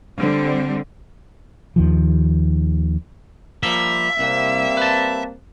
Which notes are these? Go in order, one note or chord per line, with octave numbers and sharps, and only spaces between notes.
D3 G3 C4
D#2 D#3 F3
F3 G3 A#3 E5
C2 G3 A#3 C4
B4 A5